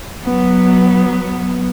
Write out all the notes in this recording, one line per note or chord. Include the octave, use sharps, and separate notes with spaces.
F#3 B3